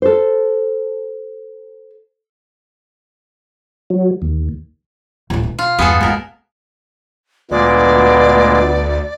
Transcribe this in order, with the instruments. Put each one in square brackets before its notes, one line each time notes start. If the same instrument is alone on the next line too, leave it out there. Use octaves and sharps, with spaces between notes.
[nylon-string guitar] A4 C5
[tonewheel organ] F#3
D#2
[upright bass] D1 D3
B2
[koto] F4
[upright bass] E2 G2 [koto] B3 G#4 A4
[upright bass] C#2 A#3 [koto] B2 A#4
[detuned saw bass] D2 [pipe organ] A#2 G#3 [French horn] B3 [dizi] D5